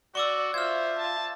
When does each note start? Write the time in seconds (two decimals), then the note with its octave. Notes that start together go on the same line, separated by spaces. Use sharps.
0.15 F#4 D5 C#6 D6 E6
0.54 F4 C5 E5 F6 G#6
0.98 A5